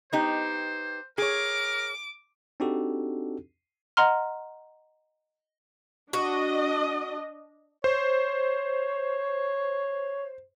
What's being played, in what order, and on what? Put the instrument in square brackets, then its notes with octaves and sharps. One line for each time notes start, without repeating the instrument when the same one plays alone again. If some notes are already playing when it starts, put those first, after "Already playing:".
[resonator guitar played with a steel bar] B3 D#4 G4 [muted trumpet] C5
[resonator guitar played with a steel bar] G#4 C#5 [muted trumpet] A#4 [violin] D6
[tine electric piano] C4 D4 D#4 F#4 G4 A4
[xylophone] D#5 F#5 A#5 C6 F6
[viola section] D4 D#5 [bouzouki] F#4
[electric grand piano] C5 [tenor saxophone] C#5